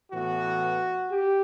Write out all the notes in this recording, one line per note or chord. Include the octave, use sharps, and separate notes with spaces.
A2 E3 B3 F#4
G4